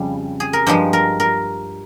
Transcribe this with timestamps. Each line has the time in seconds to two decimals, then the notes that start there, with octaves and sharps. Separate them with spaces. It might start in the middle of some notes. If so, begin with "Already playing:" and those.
Already playing: F2 C#3 G3
0.40 G#4
0.53 A#4
0.67 G2 F3 G#3 C5
0.93 A#4
1.20 A#4